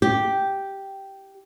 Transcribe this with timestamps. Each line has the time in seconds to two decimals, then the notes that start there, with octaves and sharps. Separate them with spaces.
0.02 G4